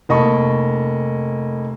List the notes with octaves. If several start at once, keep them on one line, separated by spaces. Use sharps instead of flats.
F1 A#3 D#5 A5 B5 C#6